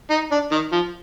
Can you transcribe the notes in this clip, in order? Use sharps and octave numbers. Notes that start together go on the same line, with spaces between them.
D#4
D4
D#3
F3